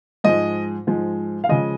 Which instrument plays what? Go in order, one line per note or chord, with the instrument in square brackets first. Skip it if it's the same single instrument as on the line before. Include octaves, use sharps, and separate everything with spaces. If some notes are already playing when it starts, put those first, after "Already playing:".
[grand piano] G#2 F3 G#3 D#5
G#2 F3 G#3
F5
C#3 F3 G#3 D#5